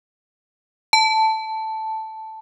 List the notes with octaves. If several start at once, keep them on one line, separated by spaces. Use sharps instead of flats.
A5